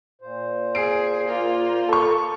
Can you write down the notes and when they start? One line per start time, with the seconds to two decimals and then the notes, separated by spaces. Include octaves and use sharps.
0.22 A#2 C5
0.75 G#4 C7 D7
1.27 A#3 F4
1.89 A4 C#6